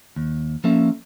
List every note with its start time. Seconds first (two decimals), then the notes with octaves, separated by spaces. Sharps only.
0.16 D#2
0.64 F3 A#3 C#4 A4 E5